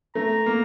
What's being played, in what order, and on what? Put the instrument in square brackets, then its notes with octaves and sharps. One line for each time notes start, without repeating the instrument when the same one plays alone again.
[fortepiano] A3 [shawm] A#5
[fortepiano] A#3